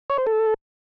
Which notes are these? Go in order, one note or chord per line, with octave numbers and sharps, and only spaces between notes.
C#5
C5
A4